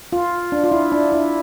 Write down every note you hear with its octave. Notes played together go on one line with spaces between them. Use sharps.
F4
D4
F4
E4
D4
E4